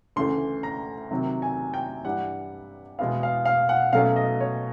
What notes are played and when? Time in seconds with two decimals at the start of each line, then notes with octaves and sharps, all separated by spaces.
0.16 D2 C#3 E3 A3 C6
0.63 A#5
1.11 C3 D#3 F#3
1.42 G#5
1.74 G5
2.05 G2 E3 G3 F#5
2.99 E2 B2 G#3 B3 E4 F5
3.23 F5
3.45 F5
3.69 F#5
3.93 B2 F#3 A3 C#4 F5
4.16 D#5
4.41 C#5